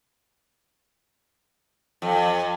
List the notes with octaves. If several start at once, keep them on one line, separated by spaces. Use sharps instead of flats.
F2